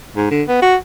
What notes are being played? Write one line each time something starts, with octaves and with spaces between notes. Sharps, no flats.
G#2
D3
B3
F#4